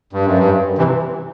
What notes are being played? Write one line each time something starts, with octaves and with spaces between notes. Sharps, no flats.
G2
F#2
G2
C3 E3